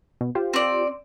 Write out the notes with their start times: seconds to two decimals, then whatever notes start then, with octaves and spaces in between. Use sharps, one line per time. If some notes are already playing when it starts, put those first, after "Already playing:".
0.21 B2
0.35 F4 G4 C5
0.54 C4 D5